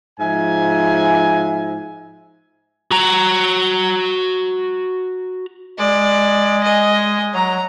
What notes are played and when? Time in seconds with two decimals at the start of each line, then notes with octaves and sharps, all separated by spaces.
0.20 G#2 F3 E5 G#5
2.91 F#4 A#5
5.78 G#3 D5
6.63 D#5 G#5
7.34 F#3 A#5